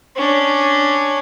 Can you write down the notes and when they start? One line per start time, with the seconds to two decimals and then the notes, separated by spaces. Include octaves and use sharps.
0.16 C#4 D4